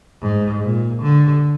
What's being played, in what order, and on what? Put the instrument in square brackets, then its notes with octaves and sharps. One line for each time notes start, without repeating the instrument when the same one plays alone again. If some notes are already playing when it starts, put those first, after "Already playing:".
[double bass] G#2
A#2
D3